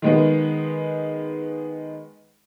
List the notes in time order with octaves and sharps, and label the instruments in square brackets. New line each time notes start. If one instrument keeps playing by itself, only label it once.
[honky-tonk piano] D#3 G#3 B3